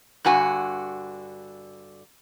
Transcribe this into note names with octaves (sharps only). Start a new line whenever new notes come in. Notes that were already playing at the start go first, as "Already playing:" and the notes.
G2 D3 F#4 G#5